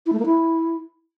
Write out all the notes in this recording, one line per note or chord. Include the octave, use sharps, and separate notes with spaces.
E4
A3
A#3
E4